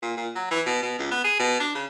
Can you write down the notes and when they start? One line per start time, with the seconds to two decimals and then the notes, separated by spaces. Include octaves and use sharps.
0.03 A#2
0.17 A#2
0.36 F#3
0.51 E3
0.66 B2
0.83 B2
0.99 C#2
1.11 B3
1.24 G#4
1.39 B2
1.60 D4
1.75 C#3